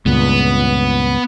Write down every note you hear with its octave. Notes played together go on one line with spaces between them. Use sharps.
C#2 G2 A#2 B3